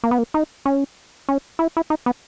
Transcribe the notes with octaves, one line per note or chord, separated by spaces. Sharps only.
A#3
B3
A#3
D#4
C#4
C#4
E4
E4
D#4
B3